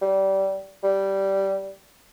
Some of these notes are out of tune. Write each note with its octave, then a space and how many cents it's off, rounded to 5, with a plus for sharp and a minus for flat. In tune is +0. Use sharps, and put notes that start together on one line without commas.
G3 -20
G3 -10